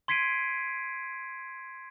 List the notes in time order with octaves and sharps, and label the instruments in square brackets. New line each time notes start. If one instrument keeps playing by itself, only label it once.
[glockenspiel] C6 G#6 B6 C7 D7 D#7